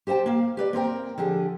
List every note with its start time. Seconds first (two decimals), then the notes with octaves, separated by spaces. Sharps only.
0.07 G4 C5 E5 G5 A5
0.26 A#3 F5
0.57 G4 B4 D5
0.73 A#3 C4 A#4 G5
1.18 D3 F3 G4 G#4